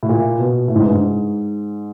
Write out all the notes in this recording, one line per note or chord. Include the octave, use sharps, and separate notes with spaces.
A2
A#2
B2
A2
G#2
G2
G#2